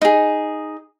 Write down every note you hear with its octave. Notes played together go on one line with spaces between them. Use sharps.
D#4 G#4